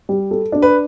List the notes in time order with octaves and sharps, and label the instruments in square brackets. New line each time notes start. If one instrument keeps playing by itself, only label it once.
[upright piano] G3
A4
D4
[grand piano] B4